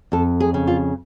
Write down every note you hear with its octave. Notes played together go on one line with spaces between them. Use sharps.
F2 A4
G#4
C#3
F4